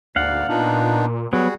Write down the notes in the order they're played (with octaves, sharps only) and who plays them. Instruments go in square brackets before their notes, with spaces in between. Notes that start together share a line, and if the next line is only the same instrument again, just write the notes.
[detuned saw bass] D2 [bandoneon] G#2 A#3 D5 [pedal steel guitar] F5 F#5
[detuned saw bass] A#2 [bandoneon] B3 D4 D#4
[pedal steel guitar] F#3 B3 [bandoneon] G3 F#4 G#4